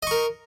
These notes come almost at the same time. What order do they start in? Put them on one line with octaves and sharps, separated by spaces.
D#5 C#6 A#4